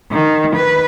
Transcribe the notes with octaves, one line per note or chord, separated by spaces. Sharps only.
D#3
B4